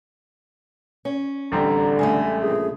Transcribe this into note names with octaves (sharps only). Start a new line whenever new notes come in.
C#4
A1 D3 G3 C4 A#5
C#3 G#3 A3 G#5
A#1 G#4